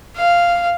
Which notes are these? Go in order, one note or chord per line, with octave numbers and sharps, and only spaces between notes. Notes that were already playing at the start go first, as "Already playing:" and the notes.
F5